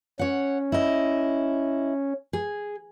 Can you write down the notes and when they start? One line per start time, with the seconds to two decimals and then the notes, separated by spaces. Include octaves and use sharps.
0.19 C#4 C#5 F#5
0.72 E4 D#5
2.33 G#4